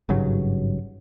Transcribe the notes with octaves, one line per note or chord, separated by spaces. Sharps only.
G#1 G2 C#3 F#3